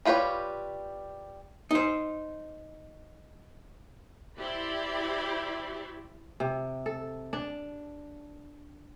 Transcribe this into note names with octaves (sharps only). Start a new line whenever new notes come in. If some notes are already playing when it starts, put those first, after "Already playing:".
G3 F4 G4 B4 C#5
D#4 C5
E4 G4 C5 D5 B5
C3
A4
D4